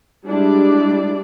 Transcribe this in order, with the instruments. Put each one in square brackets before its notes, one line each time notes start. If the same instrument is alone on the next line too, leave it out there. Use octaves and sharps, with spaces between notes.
[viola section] G3 G#3 D4 E4 G4 D5